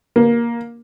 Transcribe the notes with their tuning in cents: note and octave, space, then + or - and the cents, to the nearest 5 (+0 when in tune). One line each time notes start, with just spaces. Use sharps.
A#3 +10